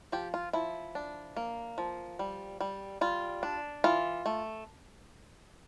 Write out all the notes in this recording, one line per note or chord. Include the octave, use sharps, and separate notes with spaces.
F3 G4
F4
F3 E4
D4
A#3
F3
G3
G3
G3 F4
D4
E3 F4
A3